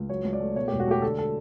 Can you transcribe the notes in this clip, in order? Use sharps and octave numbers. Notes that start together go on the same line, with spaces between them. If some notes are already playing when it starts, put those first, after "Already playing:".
Already playing: C#2
F#3 C#5
C#2
D5
A3
B2 C#5
G4
E1
F#4
A3 G4
D3 A4
A4